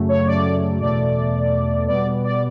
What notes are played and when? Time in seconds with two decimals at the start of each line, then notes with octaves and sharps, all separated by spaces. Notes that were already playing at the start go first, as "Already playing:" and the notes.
Already playing: F#2 C#3 F#3 A3
0.09 C#5
0.27 D5
0.81 E2 B2 A3 D5
1.88 B2 G3 B3 D5
2.24 D5